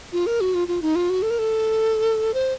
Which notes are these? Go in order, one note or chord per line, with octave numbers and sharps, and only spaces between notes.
F4
A#4
F#4
F4
F4
D#4
F4
F#4
A4
A#4
A4
C5